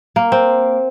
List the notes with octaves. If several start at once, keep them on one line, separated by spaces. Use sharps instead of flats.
A#3
C4